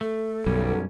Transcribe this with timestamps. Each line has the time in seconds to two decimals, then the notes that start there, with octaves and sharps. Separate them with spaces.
0.01 A3 A4
0.46 B1 F#2 G3 C#4